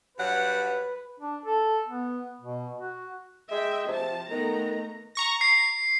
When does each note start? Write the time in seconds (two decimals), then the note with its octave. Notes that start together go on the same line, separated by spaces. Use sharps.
0.18 G2 F#3 B4 F#5
1.20 D4
1.46 A4
1.86 B3
2.41 B2
2.79 F#4
3.51 G#3 E5 G5
3.88 C3 F3 A5
4.31 D#3 A3 B3 A#5
5.15 A#5 C#6 A#6
5.41 C7